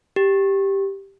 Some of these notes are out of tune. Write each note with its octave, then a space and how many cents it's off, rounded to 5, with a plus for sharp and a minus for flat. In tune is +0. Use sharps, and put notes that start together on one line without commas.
G4 +0